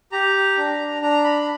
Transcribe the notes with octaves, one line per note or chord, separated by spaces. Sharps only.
G4 A#5
D4
D4 A#5
B5